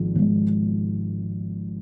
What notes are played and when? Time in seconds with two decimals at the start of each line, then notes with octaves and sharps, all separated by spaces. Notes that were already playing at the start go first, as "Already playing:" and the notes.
Already playing: G#1 G#2 F3
0.16 G#1 G#2 F3